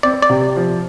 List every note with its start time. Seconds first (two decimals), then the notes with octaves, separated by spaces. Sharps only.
0.03 C4 D5
0.22 D5
0.30 C3
0.56 F3